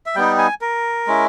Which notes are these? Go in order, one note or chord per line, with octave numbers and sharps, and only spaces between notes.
E5
G3 B3 D#4 G5
G#5
A#4
G#3 C#4 E4